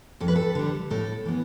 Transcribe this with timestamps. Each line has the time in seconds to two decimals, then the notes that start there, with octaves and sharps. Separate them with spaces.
0.20 F2 A4
0.28 B4
0.36 A4
0.55 D3 G3
0.90 A2 A4
1.25 E3 B3